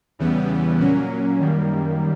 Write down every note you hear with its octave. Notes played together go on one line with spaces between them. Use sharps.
E2 C#3 E3 G3 B3
A#2 F#3 A#3 C#4
F#2 D#3 G3 A#3